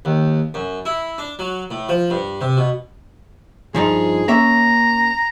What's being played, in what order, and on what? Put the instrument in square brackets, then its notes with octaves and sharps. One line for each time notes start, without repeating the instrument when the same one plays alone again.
[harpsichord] D#2
F#2
E4
D4
F#3
A2
F3
G2
C3
B2
[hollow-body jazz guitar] G2 F3 D#4 [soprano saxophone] G#4
[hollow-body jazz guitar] A#3 C#4 E5 [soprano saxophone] A#5